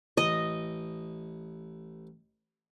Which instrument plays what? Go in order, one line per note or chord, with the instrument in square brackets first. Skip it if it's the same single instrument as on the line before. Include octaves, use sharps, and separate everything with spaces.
[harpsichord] A1 [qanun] D#5